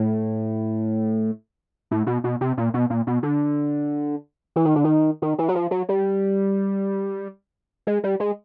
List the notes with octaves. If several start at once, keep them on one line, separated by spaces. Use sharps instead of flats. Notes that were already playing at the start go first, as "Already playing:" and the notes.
Already playing: A2
A2
B2
B2
C3
A#2
B2
A#2
B2
D3
E3
D#3
D3
D#3
D#3
E3
F#3
F3
F#3
G3
G#3
G3
G#3